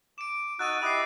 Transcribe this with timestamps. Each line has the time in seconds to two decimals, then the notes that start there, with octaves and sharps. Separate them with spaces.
0.18 D6 D7 E7
0.59 D#4 F#4 E6 F#6 A6 D#7
0.82 E4 G4 D#5 D#6 F#6 C7